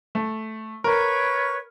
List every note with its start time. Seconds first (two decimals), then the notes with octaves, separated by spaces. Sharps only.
0.15 A3
0.84 A#4 B4 C#5 C#6